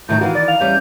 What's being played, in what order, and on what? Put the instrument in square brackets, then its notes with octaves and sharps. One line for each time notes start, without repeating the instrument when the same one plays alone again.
[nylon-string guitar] A2 D#3 F#3 [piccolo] G6
[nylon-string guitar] D#3 E3 [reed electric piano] F#4 [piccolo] F5
[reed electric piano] D5 [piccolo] A6
[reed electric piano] F5 [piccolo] F7
[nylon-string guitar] E2 G3 C#4 [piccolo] G6